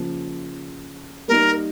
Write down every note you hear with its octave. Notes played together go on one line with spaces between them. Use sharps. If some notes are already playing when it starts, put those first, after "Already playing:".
Already playing: C#3 F3 A#3
G3 A#3 D#4 A#4